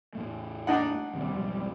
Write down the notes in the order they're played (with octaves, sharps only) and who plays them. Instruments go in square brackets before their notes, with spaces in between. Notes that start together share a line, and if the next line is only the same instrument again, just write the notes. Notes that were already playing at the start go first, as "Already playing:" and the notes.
[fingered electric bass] E2 A2 A3
[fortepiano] D4 D#4 F#5
[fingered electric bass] A1 D#2 C3 [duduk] G3
[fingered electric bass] B1 F2 G#2